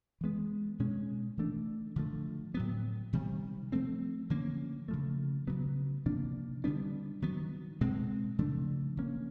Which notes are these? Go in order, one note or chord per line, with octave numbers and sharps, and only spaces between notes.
E3 G#3 B3
B2 G#3 C#4
E3 A3 D4
D3 F3 A3
A2 F#3 B3
C3 D#3 G3
F3 A3 C4
D3 F3 A#3 C#4
C#3 F3 A3
C#3 F#3 B3
C3 F3 A#3 D4
D3 G3 B3 D4
D#3 F#3 B3
B2 G#3 C4
C#3 F3 A3 D4
F3 A#3 C#4